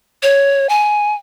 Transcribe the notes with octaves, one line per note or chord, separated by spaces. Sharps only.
C#5
G#5